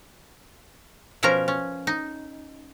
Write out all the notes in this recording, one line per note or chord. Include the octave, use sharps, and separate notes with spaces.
B2 F3 C#4 A#4 A#5
C#4
D#4